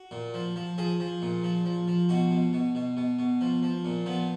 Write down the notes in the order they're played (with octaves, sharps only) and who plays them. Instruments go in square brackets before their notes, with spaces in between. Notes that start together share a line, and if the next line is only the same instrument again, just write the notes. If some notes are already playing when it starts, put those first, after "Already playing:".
Already playing: [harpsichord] F#4
A#2
F3
F3
F3 G#4
F3
A#2
F3
F3
F3
B2 F#4
B2
B2
B2
B2
B2
F3
F3
A#2
F3 B3